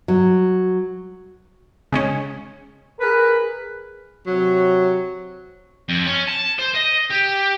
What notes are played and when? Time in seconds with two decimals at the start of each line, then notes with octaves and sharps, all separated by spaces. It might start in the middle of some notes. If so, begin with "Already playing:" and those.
0.08 F#3
1.92 C#3 G#3 C#4
3.00 G#4 A#4 B4
4.26 C3 F#3
5.89 F2
6.06 C#4
6.28 A5
6.59 C5
6.75 D#5
7.10 G4